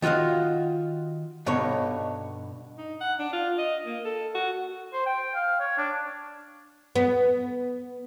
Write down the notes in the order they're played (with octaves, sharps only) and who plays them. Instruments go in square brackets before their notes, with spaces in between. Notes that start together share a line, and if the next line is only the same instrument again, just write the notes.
[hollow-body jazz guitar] D#3 F4 F#4 D#5 F5
G2 B2 D3 D#4 C#5
[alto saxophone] D#4
F#5
D4
F4
D#5
A#3
A4
F#4
[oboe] C5
G5
F5
C#5
D4
[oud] B3